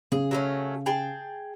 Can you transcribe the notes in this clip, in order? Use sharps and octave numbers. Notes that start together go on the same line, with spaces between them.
C#3 G#4
F#3 A3 C#4
G#4 G5 A5